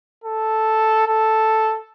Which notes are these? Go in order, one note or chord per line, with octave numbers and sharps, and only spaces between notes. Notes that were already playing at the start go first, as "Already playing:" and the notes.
A4
A4